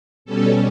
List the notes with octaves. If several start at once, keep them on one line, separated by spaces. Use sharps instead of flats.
B2 G3 C#4 A4